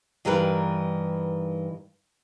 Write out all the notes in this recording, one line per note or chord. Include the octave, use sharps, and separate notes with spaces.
G2 D#3 E3 G3 A#4 B4